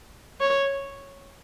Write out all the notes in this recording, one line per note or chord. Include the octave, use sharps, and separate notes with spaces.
C#5